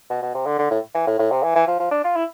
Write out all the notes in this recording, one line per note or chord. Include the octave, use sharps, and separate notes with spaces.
B2
B2
C3
D3
D3
A2
E3
A2
A2
C3
E3
E3
F3
F3
D4
F4
E4